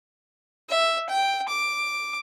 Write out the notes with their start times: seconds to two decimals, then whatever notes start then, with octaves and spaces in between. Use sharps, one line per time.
0.69 E5
1.09 G5
1.48 D6